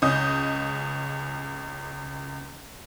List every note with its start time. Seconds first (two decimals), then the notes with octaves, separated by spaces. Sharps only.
0.02 C#2 C#4 D#5 D#6 G6